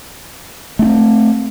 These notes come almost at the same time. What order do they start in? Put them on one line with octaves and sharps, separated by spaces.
A3 D4 C4